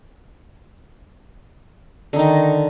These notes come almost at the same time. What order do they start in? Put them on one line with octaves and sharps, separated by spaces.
D3 D#4 D#3